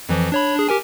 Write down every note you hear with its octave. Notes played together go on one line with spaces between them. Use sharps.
F2 E3 F3
D4 C#5 B5
D4 G#4
G4 A#4 G#5